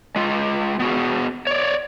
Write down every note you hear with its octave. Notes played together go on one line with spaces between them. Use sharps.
G#3 F4
B3 F#4 G#4
C#5 D5